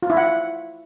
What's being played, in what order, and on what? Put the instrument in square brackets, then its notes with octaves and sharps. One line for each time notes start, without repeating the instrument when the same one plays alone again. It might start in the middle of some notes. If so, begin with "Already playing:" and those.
[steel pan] F4
E4
F#5